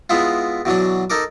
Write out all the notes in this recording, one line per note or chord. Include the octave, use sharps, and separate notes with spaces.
G#3 B3 E4 F4
B2 E3 F#3 D4
D#4 A4 A#4 D6